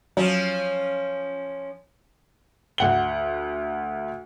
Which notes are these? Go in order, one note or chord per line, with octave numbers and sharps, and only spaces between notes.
F3 F#3 C#4
D2 F#5 G7